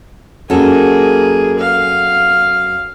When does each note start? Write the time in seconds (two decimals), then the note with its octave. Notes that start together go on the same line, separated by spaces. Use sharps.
0.50 F#2 A#3 G#4 A4
1.59 F5